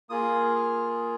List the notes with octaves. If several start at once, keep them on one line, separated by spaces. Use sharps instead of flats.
A#3 F4 G#4 D#6
F6